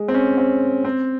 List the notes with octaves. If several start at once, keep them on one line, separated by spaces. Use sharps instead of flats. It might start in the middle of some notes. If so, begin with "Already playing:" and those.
Already playing: G#3
C4
C#4
C4
C4